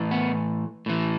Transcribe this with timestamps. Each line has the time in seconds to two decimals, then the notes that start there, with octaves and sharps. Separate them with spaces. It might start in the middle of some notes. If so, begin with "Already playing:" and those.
Already playing: A2 E3
0.11 B3
0.86 A2 E3